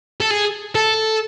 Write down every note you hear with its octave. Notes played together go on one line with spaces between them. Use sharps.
A4
G#4
A4